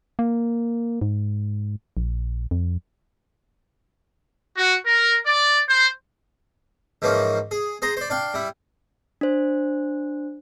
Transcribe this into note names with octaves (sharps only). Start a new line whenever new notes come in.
A#3
G#2
A#1
F2
F#4
A#4
D5
C5
G#2 E3 F3 A#3 C#4
G#4
G#4 C5 A#5
C5 D5
D4 F5 G5
G3 E4
D4 C5